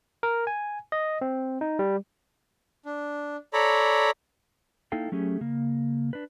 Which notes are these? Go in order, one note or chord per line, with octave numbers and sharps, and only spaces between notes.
A#4
G#5
D#5
C4
D#4
G3
D4
A4 C#5 D5 A#5 B5
A#3 D#4 E4 A4 F5 G5
F#3 A3 C#4 G4 G#4
C#3 A#3
D4 B4